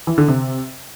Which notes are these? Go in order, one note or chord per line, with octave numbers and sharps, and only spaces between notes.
E3
D3
C3